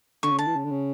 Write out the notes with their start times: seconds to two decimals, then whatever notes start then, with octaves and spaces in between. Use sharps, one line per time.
0.23 D3 C#6
0.32 C#3
0.39 D3 A5
0.47 E3
0.55 C#3
0.64 D3
0.71 C#3